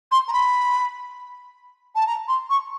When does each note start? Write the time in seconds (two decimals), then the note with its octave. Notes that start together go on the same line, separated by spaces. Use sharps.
0.11 C6
0.28 A#5
0.33 B5
1.95 A5
2.07 A#5
2.28 C6
2.50 C#6